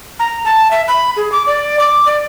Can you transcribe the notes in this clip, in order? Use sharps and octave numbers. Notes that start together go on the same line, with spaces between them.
A#5
A5
E5
B5
G#4
D6
D5
D6
D5